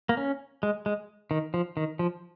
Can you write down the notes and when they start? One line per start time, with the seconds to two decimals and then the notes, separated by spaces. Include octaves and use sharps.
0.09 A#3
0.17 C#4
0.63 G#3
0.86 G#3
1.31 D#3
1.54 F3
1.77 D#3
1.99 F3